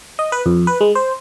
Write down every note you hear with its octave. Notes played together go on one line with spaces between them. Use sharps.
D#5
B4
F2
B4
G#3
C5